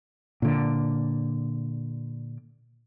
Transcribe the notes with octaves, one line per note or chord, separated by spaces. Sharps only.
A#2 D3